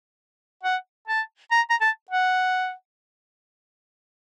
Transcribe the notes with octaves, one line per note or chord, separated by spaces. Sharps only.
F#5
A5
A#5
A#5
A5
F#5